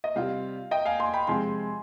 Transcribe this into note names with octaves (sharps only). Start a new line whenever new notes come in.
D#5
C3 G3 C4 F4 F5
D#5 G5
F5 G#5
G#5 C6
G5 B5
C3 F3 G#3 C4 G#5 C6